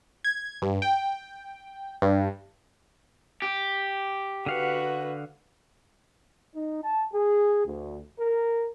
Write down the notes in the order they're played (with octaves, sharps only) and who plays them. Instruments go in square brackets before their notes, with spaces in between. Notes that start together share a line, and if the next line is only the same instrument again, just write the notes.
[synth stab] G#6
G2
G5
G2
[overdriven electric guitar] G4
[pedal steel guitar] D3 F5 F#5 [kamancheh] F#4 B4
[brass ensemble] D#4
A5
G#4
D2
A#4